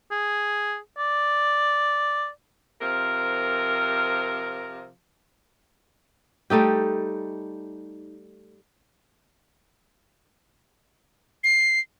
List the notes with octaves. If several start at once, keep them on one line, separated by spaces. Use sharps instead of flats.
G#4
D5
C3 F3 A#4
G3 A3 D#4 G4
C7